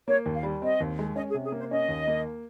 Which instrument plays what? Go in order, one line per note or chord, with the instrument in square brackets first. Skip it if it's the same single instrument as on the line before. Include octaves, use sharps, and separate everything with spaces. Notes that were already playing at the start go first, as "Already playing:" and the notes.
[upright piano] A#3 [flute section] C#5
[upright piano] D#2
[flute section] F5
[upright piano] G3
[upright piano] C4 [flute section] D#5
[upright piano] D#2
G#3
[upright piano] C#4 [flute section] D#5
[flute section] G#4
[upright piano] C3
[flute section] G#4
[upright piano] A#3
[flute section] C5
[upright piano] C#4 [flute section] D#5
[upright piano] D#2
A#3